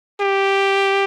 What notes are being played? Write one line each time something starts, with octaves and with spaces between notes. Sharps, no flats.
G4